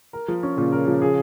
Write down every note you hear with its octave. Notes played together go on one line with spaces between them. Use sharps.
A#4
F3
C#4
A#2 C#3
A#4
F3
G#4